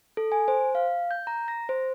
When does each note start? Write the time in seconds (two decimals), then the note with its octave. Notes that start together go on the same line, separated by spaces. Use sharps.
0.17 A4
0.32 G#5
0.48 C5
0.75 F5
1.11 G6
1.27 A#5
1.48 A#6
1.69 C5